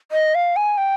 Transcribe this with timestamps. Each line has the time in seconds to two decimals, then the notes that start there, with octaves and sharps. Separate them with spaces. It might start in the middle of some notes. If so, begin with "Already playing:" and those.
0.12 D#5
0.35 F5
0.56 G#5
0.77 G5